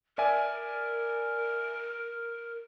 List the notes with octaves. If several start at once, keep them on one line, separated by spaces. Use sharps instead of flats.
A#4 D5 E5 G#5